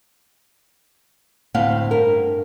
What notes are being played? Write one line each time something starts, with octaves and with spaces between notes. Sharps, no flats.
D2 A2 C4 F5 F#5
G2 A#4